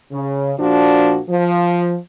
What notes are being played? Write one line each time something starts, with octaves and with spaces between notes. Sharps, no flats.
C#3
A#2 F3 D4 F#4
F3